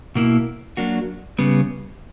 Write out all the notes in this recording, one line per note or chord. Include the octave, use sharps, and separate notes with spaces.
B2 A#3 E4
F#3 A#3 D4 F#4
C#3 G3 B3